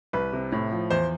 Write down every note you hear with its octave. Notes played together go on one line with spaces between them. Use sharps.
C2 B4
C3
A2
F3
E2 C5